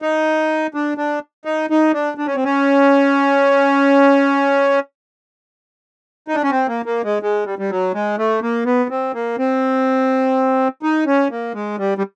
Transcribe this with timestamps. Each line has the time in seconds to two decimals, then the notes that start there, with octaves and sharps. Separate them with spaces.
0.02 D#4
0.74 D4
0.98 D4
1.45 D#4
1.70 D#4
1.93 D4
2.18 D4
2.27 C#4
2.35 C4
2.44 C#4
6.28 D#4
6.35 D4
6.43 C#4
6.51 C4
6.68 A#3
6.86 A#3
7.04 G#3
7.23 G#3
7.46 G3
7.59 G3
7.70 F#3
7.94 G#3
8.18 A3
8.42 A#3
8.66 B3
8.90 C4
9.15 A#3
9.38 C4
10.83 D#4
11.06 C#4
11.31 A#3
11.55 G#3
11.78 G3
11.98 G3